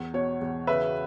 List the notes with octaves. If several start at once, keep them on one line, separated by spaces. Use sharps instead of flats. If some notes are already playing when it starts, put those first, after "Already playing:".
Already playing: E2
B2 C#5
E2
C#3 B4 E5